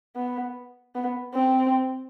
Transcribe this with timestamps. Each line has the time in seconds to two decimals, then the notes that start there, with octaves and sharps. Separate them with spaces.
0.16 B3
0.95 B3
1.34 C4